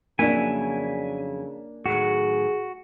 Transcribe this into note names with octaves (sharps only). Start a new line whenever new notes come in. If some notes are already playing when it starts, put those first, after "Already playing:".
F2 C#3 F#3 A#3 D4 E4 G#5
A2 D#3 F#3 F#4 G#4